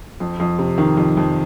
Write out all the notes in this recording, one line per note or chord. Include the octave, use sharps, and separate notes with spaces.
F2
F2
C3
D#3
F2
F2